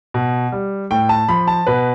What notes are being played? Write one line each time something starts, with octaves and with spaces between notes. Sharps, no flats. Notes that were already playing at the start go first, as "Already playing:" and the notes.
B2
G3
A2 G5
A5
F3 B5
A5
B2 B4